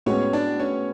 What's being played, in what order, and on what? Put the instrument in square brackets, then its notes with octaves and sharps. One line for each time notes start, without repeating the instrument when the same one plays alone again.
[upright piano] A2 G#3 B3 F#4 [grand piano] C#4 C#5
[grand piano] D4 D5
C#4 C#5